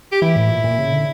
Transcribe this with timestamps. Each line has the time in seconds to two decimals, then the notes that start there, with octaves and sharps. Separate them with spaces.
0.12 G4
0.22 E3 E4
0.36 A2
0.50 A#2
0.64 A#2
0.79 C#3
0.92 D3